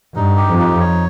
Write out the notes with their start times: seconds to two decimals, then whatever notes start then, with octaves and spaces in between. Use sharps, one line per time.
0.16 G2 D#4
0.37 G4
0.49 F2
0.59 D#4
0.80 C#5